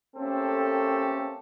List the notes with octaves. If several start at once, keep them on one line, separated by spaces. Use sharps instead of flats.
A3 A#3 C4 C#4 G4 A4